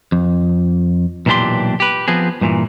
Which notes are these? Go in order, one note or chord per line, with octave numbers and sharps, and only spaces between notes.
F2
B1 A#2 E3 D4 G4 C6
G4 B4
F3 B3 C4 G#4
G2 A#2 E3